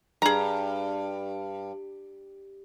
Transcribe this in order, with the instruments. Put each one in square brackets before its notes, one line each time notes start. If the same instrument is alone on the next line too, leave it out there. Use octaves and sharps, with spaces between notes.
[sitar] G2 [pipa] G#4 A#5